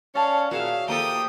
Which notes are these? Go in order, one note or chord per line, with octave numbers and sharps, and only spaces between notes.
C#4 C#5 D5 F5 A5
A#2 F#4 G#4 E5 F5
F3 A#3 G4 A4 G5 A#5 D#6